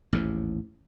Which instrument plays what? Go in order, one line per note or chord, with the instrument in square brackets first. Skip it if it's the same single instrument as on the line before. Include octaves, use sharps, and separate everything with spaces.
[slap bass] A1 D#2 G#2